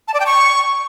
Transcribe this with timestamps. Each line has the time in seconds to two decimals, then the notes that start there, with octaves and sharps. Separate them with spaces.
0.08 A5
0.14 D5
0.20 G5
0.26 C#6